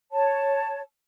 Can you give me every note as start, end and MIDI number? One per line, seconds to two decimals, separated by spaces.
0.12 0.81 73
0.12 0.81 81